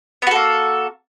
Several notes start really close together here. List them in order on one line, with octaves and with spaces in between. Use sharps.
B3 F#4 A4 A#3